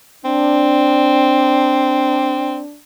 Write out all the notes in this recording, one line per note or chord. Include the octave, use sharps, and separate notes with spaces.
C4 D4